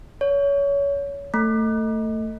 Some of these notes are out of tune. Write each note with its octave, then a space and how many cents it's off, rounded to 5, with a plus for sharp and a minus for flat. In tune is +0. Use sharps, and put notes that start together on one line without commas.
C#5 +25
A3 +20